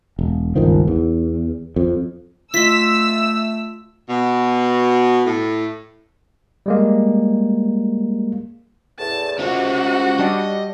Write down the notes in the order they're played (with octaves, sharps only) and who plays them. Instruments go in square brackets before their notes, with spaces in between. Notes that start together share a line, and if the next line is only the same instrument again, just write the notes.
[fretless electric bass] E1
G1 C#2 D#3 F3
E2
F2
[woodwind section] A3 [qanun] F4 D#5 [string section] E6 [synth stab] B6
[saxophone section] B2
A2
[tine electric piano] G3 G#3 A#3
[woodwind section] E2 A2 [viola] A5
[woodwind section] G#2 C3 A#3 [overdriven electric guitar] C#4 F4 [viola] F#4
[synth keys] G3 D4 [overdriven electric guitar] D#5